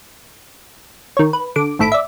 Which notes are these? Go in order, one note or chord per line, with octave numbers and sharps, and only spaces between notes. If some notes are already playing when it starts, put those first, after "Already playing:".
D#3 C#5
B4
D3 D6
G#1 A2 A4 B5 D7
D5 E5